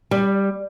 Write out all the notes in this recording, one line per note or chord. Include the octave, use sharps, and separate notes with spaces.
G3